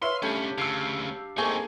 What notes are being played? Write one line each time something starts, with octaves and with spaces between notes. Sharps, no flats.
B4 C#5 E5 F5 C6
C2 G3 A3 C#4 D4 G4
D2 C#3 F5 E6 C7
A3 A#3 C4 D#4 G#4 G#5